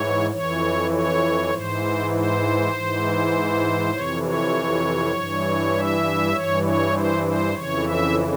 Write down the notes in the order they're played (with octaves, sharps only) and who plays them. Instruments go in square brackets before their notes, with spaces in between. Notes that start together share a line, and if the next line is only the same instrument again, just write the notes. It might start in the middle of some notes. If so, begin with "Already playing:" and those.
Already playing: [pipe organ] G#2 E3 C#5
F2 E3 C#5
C#5
G#2 E3 C5
C5
G#2 E3
F2 C3 E3 C#5
C#5
G2 E3
E5
G2 E3 C#5
C#5
C5
C5
F2 C#3 E3 C#5
E5